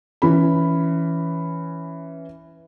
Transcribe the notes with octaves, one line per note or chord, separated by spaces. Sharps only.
E3 C#4 B5